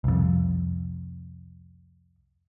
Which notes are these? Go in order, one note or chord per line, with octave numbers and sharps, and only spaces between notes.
C2 F2